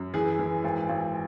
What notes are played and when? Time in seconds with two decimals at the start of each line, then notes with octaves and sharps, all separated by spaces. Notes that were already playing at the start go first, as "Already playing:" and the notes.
Already playing: F#2
0.14 E3 G#4
0.39 E3
0.64 G#1
0.89 G#1